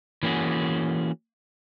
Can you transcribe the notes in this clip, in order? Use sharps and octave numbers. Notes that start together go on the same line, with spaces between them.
E3 A#3 C#4 F#4 G#4